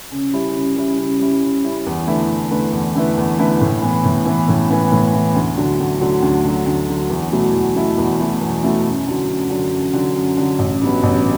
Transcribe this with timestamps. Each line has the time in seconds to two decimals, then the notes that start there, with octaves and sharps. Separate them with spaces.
0.11 C#3
0.33 G3 C#4 E4
0.55 C#3
0.76 G3 C#4 E4
0.98 C#3
1.20 G3 C#4 E4
1.43 C#3
1.64 G3 C#4 E4
1.86 E2
2.07 D3 A3 E4 B4
2.29 E2
2.51 D3 A3 E4 B4
2.73 E2
2.95 D3 A3 E4 B4
3.17 E2
3.38 D3 A3 E4 B4
3.61 A2
3.82 E3 B3
4.04 A2
4.26 E3 B3
4.48 A2
4.70 E3 B3
4.92 A2
5.13 E3 B3
5.35 D2
5.57 D3 F#3
5.80 D2
6.01 D3 F#3
6.22 D2
6.44 D3 F#3
6.66 D2
6.88 D3 F#3
7.10 E2
7.32 B2 F#3 A3 E4
7.53 E2
7.76 B2 F#3 A3 E4
7.98 E2
8.19 B2 F#3 A3 E4
8.41 E2
8.63 B2 F#3 A3 E4
8.85 F#2
9.07 D3 F#3
9.28 F#2
9.50 D3 F#3
9.72 F#2
9.93 D3 F#3
10.16 F#2
10.37 D3 F#3
10.59 A1
10.81 G2 F#3 B3
11.03 A1